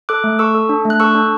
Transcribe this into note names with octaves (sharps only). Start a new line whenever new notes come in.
A4 D6 F#6
A3
A4 C#6 E6
A4
D4
A3
F#6
A4 C#6 E6
D4